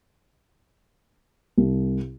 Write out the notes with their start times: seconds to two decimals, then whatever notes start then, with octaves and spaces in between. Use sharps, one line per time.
1.58 C2